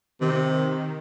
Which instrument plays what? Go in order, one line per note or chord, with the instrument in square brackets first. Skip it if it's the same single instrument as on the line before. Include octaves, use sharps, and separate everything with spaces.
[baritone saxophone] C3 [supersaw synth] D#3